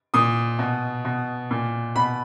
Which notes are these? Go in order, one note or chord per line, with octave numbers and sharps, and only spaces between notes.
A#2 D#6
B2
B2
A#2
B2 B5